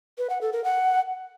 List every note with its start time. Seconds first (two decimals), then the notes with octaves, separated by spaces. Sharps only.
0.18 B4
0.29 F#5
0.41 A4
0.53 A#4
0.64 F#5